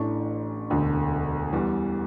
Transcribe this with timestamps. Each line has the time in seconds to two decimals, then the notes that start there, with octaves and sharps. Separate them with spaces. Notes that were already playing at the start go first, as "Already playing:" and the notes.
Already playing: A1 A2 E3 A3 D4 C#6
0.70 E1 D2 D3
1.53 E2 E3 G3